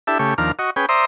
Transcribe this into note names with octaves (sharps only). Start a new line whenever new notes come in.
D4 E4 G4 A4 E5
C#3 A3 G4 C#6
D#2 F3 D4 A#4 F6
F#4 D#5 C#6
C#4 G#4 B4 G5
C5 D5 E5 A#5 C6 D#6